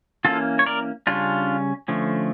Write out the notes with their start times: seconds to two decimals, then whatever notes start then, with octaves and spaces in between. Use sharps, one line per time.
0.25 E3 A#3 C#4 F4 A4
0.59 C#5
0.66 A#4 D5
1.07 C#3 G3 C#4 D4 F4
1.88 D3 F3 A3 C#4